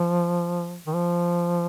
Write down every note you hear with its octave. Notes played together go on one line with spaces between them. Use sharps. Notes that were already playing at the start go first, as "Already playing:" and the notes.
Already playing: F3
D#3
F3